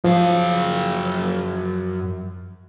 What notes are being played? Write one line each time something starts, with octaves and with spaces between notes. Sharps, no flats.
F#2 F3 F5